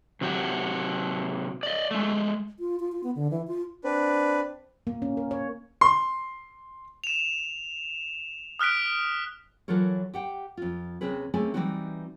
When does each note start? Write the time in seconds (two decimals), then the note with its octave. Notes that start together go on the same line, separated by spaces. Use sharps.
0.21 C3 F#3 F#4 G4
1.63 D5 D#5
1.91 G#3 A3
2.59 F4
2.80 F4
2.92 F4
3.04 B3
3.15 D3
3.31 E3
3.48 F4
3.84 C4 D4 B4
4.87 A#3
5.02 C#4
5.17 A#4
5.31 C#5
5.81 C6
7.04 E7 F7
8.59 D#6 F6 F#6 B6 D7
9.68 E3 F#3 F4 A4 A#4 C#5
10.14 G4 F#5 G5
10.57 F2 F4
11.01 D#2 C3 C4 C#4 G#4 B4
11.34 A3 A#3 C4 C#4 G#4 G#5
11.54 E3 F#3 G3 C4 D#4 F#4